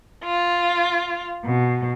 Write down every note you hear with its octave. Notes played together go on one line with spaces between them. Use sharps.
F4
B2